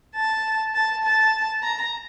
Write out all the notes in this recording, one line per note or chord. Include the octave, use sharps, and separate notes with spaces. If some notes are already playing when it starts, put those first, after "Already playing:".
A5
A5
A5
A#5